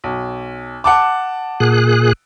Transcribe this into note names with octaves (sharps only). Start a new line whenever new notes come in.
B1
F#5 A5 D6
A#2 G#4 F#6